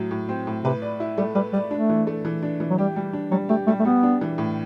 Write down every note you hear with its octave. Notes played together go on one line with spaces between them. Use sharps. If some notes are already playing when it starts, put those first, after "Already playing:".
Already playing: A2 F#3
A2
C4
A2
C3 B4
D5
E4
G3 A3
G3 B4
G3 D5
A3 D4
E3
A3
E3
D4
E3
F#3
G3 G4
G3
D4
F#3 G3
A3 G4
G3 A3
A3
G3 B3
D4
E3
A2